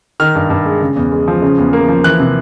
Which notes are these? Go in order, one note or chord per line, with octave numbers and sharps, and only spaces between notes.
D#3 F6
G2
G2
G#3
C#3
E2
G#3
F3
C#3
E2
A#3
F3
E3 F#6
C3